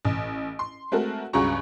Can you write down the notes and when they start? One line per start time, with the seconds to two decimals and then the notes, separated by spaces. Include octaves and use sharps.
0.05 A1
0.59 C6
0.92 G#3 A3 C4 F#4 A4 A#4
1.33 C#2 G2 C#4 F#4 A#5 C#6